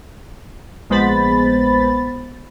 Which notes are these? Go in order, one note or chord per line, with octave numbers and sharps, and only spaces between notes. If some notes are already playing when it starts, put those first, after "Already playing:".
A#1 G#3 B3 C5 B5 A6